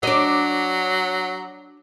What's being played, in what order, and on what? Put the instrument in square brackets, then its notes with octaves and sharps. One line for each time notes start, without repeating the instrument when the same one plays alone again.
[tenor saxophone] F#3 [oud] D4 D#5